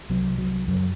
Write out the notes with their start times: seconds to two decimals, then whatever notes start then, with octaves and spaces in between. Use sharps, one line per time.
0.10 C2 C3 F#3
0.38 F#3
0.68 F#2 C#3 F#3